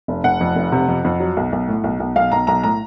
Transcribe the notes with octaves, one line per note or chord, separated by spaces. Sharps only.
F1
F1 F#5
F2
F1
C3
F2
F2
F#3
B1
B1
A2
B1
B1
B1 F5
B1 A#5
B1 A#5
A2 A#5